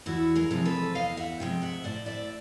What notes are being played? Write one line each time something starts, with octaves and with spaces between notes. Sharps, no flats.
E2 E4 F#4
G#4 A#4
C3 F3 G#3
A4 B4
E2 D#5 F5
E5 F#5
C3 F3 G#3 G5
E5 F#5
A2 C5 D5
D5 E5